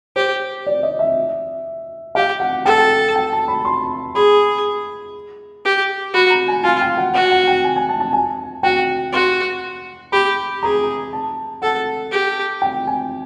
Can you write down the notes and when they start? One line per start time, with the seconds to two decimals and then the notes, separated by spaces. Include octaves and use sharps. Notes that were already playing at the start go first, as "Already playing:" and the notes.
0.16 G4 C5
0.66 D5
0.83 D#5
0.99 E5
2.15 G4 F5
2.40 F#5
2.65 A4 G5
3.15 G5
3.33 A5
3.48 B5
3.65 C6
4.15 G#4 B5
5.65 G4
6.14 F#4 B5
6.30 A#5
6.48 G#5
6.63 F4 G#5
6.81 G5
6.97 F#5
7.14 F#4 F#5
7.31 F#5
7.48 G5
7.64 G#5
7.76 G#5
7.89 A5
8.00 A5
8.13 G#5
8.63 F#4 G5
9.12 F#4 C6
10.12 G4 B5
10.62 G#4 A#5
11.13 A5
11.62 A4 F#5
12.12 G4
12.62 G5
12.87 G#5